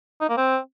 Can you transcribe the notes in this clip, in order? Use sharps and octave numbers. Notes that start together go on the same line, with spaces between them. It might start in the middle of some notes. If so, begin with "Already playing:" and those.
D#4
A#3
C4